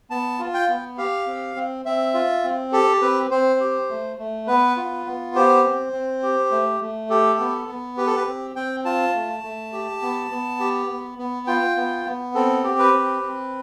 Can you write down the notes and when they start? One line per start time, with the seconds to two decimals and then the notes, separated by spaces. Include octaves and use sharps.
0.10 B3 A5
0.39 F4
0.54 G5
0.68 B3
0.98 G4 F5
1.27 C4
1.56 C4
1.85 C4 E5
2.14 F4
2.44 C4
2.72 G4 A4
3.02 C4 B4
3.31 C4 C5
3.60 G4
3.89 A3
4.18 A3
4.47 B3 B4
4.77 F4
5.06 B3
5.35 G4 C5
5.64 C4
5.93 C4
6.23 G4
6.51 A3
6.81 A3
7.10 G4 A4
7.40 B3
7.68 B3
7.97 G4 B4
8.07 A4
8.16 B4
8.27 C4
8.56 C4 G5
8.85 F4 A5
9.14 A3
9.43 A3
9.73 G4
10.02 B3
10.31 B3
10.60 G4
10.89 B3
11.18 B3
11.47 F4 G5
11.76 B3
12.06 B3
12.35 C4 A4
12.64 G4
12.79 B4
12.93 C4
13.22 C4